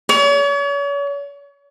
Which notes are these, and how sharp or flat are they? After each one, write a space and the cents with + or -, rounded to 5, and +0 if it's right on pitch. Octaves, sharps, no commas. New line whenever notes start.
C#5 +40